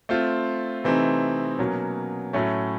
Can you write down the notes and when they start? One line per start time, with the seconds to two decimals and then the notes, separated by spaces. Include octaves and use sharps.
0.09 A3 C4 F4
0.84 C3 E3 A3 C4 D#4
1.59 B2 F#3 A#3 C#4
2.33 A2 F#3 A3 C#4